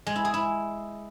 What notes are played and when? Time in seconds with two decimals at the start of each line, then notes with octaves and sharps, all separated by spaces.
0.07 G#3
0.16 E4
0.25 G#4
0.34 E4